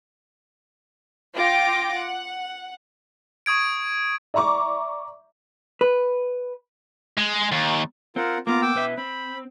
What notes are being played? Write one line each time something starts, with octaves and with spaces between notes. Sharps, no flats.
F4 G5 D6 A#6
F#5
C#6 D#6 G#6 D7
D5 E5 A#5 C#6 D6
B4
G#3
D#2
C4 F4 A#4 F#5
A#3 B3 F4 A#5 D6
G5 D6 E6
B2 B4 E5
C4 B5